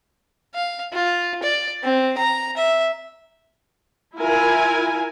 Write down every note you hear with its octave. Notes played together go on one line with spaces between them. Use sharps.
F5
F4
D5
C4
A#5
E5
E4 F4 A#4 G#5